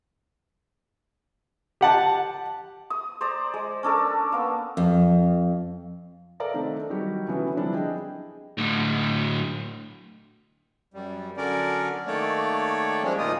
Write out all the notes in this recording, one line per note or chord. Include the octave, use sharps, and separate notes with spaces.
G4 F#5 A5
D#6
C5 D5 A#5
G#3
C#4 D4 A4 A#4
A#3 B3
F2
A4 A#4 D5 F5 A#5
D#3 A3 C4 D4
D#3 F#3 G3 F#4 G4
D3 E3 F#3 B3 C#4
D3 F3 G3 C4 D4 E4
G#4 D#5 G5
A2 D3
F#2 G3
D3 F#3 C#4 A#4 D5
D#3 A3 A#3 C#5 D5
F3 G3 G#3 A#3 C#4 D4
D2 A#2 A#3 D#4 F4 D#6